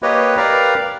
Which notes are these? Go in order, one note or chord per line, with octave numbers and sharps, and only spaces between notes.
A#3 G4 B4 C#5 D#5
G4 A#4 B4 D5 F5 A#5